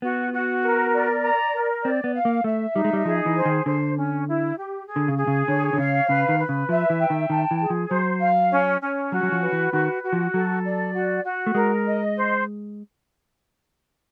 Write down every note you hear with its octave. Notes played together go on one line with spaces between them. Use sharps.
B3 F#4
F#4
A#4
D5
A#5
A#4
C4 D5
B3
F5
A#3
A3 E5
G3 D#4
G#3
G3
F3 G#4
E3
C5
D#3
D3 C5
C#4
E4
G4
G#4
D3
C#3
G#4
C#3
D3 C#5
D3
C#3 F5
C#3 B4
D#3
B4
C#3
F3 E5
E3
G5
D#3
D#3 A5
E3
G#4
F3
F#3 C5
F5
C#4
C#4
F#3 F#4
F#3
F3
B4
E3
D#3 F#4
F#4
F3
F#3 A4
D5
F#4
F#4
A3
G#3 A#4
D#5
C5